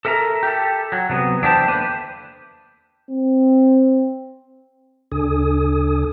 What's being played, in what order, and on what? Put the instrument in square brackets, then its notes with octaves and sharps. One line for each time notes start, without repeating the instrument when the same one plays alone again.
[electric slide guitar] A4 A#4 E5 G5 A#5
G4 A4
F#3
C3 F#3 B3
E2 D4 E4 G4 C5 A5
D3 A#3 D4 B4 C5
[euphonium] C4
[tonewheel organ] D2 C#3 D4 A4 G#5 D#6